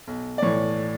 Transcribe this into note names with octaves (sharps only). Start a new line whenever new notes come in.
B1
D5
A2 E3 C#5